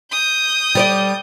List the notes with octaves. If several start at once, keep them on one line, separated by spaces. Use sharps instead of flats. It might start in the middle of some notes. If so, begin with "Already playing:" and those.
D#6 G6
G3 C#5 D5